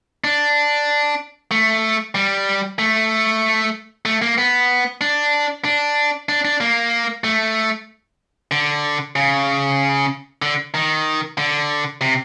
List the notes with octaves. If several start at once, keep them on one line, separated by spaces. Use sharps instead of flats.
D4
A3
G3
A3
A3
A#3
B3
D4
D4
D4
D4
A#3
A3
D3
C#3
D3
D#3
D3
C3